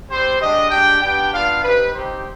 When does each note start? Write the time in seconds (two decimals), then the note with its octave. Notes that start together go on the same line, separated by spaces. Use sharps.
0.10 G3 C4 G4 C5
0.40 G#3 D4 G4 D#5
0.71 G#3 D4 G4 G5
1.01 B3 D4 G4 G5
1.32 B3 D4 F4 F5
1.63 C4 D#4 G4 B4
1.94 G3 C4 D#4 G4 C5